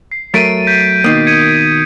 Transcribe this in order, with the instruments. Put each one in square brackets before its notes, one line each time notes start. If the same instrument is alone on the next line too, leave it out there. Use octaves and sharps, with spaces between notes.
[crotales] C7
[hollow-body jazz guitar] F#3 A3 A#4 [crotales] A6 D7 D#7
[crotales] G6 B6
[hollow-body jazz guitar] B2 D#3 A#3 [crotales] D#6
[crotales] G#6 C#7 D#7